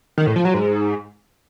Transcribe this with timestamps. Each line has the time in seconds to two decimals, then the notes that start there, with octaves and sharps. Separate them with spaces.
0.18 D#3
0.27 A2
0.36 F3
0.45 F#3
0.54 G#2